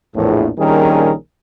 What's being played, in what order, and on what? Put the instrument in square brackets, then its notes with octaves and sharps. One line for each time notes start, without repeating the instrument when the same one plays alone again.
[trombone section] A#1 E2 A2
A#1 D#3 G3 C#4 G#4 A#4